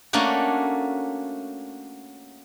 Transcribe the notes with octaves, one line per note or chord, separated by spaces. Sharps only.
A3 A#3 C#4 D4 F#4